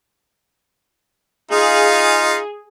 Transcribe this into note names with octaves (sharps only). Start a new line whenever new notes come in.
D#4 F4 G#4 F5